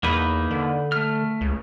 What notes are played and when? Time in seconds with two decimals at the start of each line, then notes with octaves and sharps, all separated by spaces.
0.03 E2 A#3 D#4 B4
0.51 D3
0.92 A3 F6
1.41 C#2